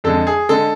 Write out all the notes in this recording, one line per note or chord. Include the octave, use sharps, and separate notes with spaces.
F2 D3 G#3 A4
G#4
D3 G#3 A4